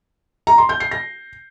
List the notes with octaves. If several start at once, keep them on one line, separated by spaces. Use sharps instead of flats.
A#5
C6
G6
C7
A#6